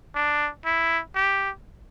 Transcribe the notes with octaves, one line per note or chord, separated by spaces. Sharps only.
D4
E4
G4